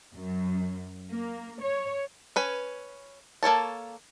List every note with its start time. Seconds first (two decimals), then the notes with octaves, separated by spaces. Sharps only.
0.14 F#2
1.11 A#3
1.61 C#5
2.36 C#4 B4 G#5
3.43 A#3 A4 C#5 A5